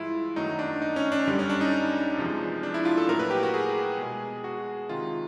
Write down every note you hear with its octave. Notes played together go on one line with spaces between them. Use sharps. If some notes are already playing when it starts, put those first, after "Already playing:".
Already playing: G2 E3 G#3 E4 F4
F#2 D#3 F#3 A3 D#4
D4
D#4
C#4
D4
F#2 D3 G3
C#4
D4
D#4
E2 C3 F3 G#3
D4
E4
F4
A4
A#2 F#3 A3 A#4
B4
G4
F#4
G#4
B2 G#3
F#4
C3 D#3 G#3 F4